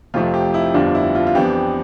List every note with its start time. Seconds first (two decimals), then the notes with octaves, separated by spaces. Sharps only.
0.14 F1 F2 C3 F3 A3 F4
0.34 G4
0.54 E4
0.74 G1 F2 D3 G3 D4 F4
0.95 E4
1.15 F4
1.27 F4
1.35 F2 E3 B3 D4 G4